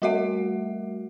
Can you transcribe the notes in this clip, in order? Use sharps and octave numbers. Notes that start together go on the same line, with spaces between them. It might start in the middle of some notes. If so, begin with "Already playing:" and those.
G3 A3 F#4 A#4 E5 F#5